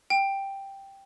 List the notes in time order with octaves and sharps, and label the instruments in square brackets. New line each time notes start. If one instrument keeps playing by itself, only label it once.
[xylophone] G5